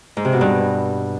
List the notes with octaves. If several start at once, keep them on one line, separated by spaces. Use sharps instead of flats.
G#2
C3
B2
G2